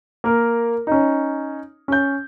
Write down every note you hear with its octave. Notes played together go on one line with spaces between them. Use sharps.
A#3 A#4
C#4 D#4
C#4 G6